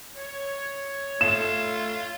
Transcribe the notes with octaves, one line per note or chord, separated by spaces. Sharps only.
C#5
A3 F4 E7